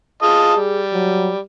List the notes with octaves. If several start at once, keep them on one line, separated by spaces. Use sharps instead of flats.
F4 G#4 D#5 A5
G3
F#3